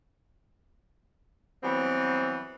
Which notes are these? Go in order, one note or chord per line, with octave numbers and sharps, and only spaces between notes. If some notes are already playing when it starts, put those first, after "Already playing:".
E3 F#3 G3 B3 C4